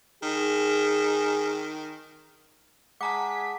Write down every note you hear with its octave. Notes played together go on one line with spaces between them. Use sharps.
D#3 G#4
G#3 F#5 A5 A#5 D6 B6